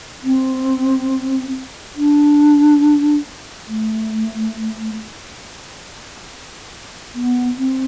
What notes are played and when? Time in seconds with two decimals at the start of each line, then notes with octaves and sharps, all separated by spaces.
0.24 C4
1.96 D4
3.69 A3
7.15 B3
7.58 C4